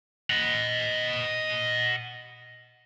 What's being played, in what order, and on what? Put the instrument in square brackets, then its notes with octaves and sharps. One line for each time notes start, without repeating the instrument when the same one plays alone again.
[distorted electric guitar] D#5 F#5